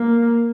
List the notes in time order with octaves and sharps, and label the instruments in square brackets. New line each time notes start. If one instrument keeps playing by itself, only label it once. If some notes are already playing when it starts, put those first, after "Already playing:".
Already playing: [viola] A#3